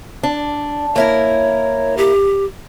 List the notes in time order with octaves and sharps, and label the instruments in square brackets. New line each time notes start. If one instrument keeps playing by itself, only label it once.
[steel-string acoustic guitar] D4
[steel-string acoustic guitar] A#3 E4 A#4 [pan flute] C#5
[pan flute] G4